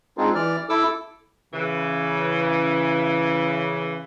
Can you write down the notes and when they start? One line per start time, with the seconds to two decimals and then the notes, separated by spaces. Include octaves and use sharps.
0.18 G#3 C4 D4 D#4 F4 G#4
0.35 E3 D5 F6
0.69 E4 A4 D6 E6
1.53 C#3 E3